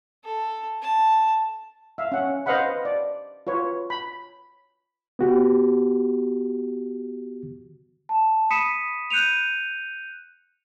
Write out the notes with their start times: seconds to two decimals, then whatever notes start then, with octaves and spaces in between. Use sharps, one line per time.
0.24 A4
0.82 A5
1.98 E5 F5
2.12 C#4 F#5
2.46 B4 C5 D#5 F5 F#5 B5
2.85 D5
3.47 F4 B4 C#5
3.90 B5
5.19 B3 F#4 G4
8.09 A5
8.51 B5 D#6 B6 C#7 D#7 E7
9.10 F#6 G6 C#7 D#7 F7